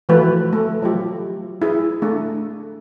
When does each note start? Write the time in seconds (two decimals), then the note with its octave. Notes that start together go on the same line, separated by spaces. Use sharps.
0.09 E3 F3 A3 F#4 B4
0.53 A3
0.82 F#3 F4 G4
1.62 E4 G#4
2.02 A3 D4